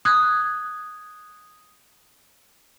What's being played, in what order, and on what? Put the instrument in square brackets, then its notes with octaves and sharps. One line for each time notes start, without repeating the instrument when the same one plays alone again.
[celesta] D#6 F#6 G#6